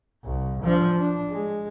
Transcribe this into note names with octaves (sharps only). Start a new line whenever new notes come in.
C2
F3 D4
D4
G#3